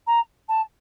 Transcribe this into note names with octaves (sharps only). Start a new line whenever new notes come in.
A#5
A5